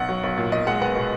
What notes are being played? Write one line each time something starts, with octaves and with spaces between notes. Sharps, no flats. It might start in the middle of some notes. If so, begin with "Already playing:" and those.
Already playing: B1 F#5
F#3
B1
A#2
B1 D#5
G#3 F#5
B3 F#5
B2